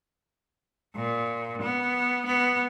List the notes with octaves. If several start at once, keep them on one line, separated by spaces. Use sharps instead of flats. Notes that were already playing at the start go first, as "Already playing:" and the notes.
A#2
B3
B3